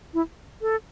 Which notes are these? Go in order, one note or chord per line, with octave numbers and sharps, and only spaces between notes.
E4
A4